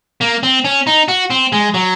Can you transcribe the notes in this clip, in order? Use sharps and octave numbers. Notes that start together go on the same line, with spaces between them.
A#3
C4
C#4
D#4
F#4
C4
G#3
F#3